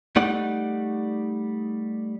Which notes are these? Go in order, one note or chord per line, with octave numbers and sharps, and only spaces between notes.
G3 A3 D#4 D5 F#5